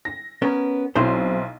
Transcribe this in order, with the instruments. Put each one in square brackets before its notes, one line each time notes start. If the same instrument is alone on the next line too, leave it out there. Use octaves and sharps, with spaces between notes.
[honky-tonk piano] A#6
[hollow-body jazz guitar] B3 C#4 A#4
[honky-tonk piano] B1 E4 C6 [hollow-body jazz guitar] F#3 C4 C5